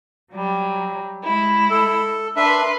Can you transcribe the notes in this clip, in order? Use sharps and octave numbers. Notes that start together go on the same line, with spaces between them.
F#3 G3
G#3 E4
A4
D4 A#4 B4 E5 C6